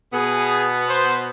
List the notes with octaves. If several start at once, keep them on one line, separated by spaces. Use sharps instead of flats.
B2 B3 G#4
C5